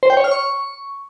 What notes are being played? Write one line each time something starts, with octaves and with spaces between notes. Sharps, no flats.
C5
G5
C#5
F6
C#6